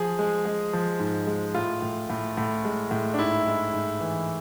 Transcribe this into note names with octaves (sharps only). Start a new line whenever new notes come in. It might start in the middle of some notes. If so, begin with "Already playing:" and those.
Already playing: F3 G#4
G#3
G#3
F3
G#2
G#3
A2 F4
A2
A2
A2
G#3
A2
D4
G#2 E4
G#3
G#2
E3